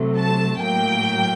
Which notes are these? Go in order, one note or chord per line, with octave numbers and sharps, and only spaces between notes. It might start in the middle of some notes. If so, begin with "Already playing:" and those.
Already playing: C3 F#3 A3
A5
A2 F#3 A#3 G5